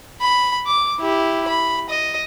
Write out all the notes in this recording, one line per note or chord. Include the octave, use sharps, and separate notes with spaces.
B5
D6
E4 G4
B5
D#5